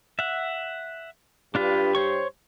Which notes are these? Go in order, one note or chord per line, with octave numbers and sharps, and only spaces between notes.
E5 F#5
G2 D4 F4 G4 B4
C5 C#5 C#6